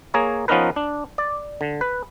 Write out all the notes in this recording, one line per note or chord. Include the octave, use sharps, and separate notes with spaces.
A#3 G#4 C#5 A#5
F3 B3 C#4 D#4 A#4 B4
D4
D5
D3
B4